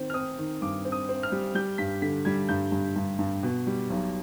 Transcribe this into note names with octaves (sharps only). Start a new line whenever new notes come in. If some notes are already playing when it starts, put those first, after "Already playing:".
Already playing: D#3 C4
F6
C4 D#6
D#3
G2 D6
C4
D#6
C4
F6
G3
G3 G6
G2 B6
D3 B6
G3 G#6
G2 G6
G2
G2
G2
B2
G3
B1